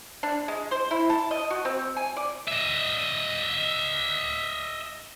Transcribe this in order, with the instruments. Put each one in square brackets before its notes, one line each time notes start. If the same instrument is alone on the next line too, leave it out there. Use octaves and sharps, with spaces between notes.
[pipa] D4
G#3
C5
E4
A5
D#5
F#4
C4
G#5
D5
[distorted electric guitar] D#5 E5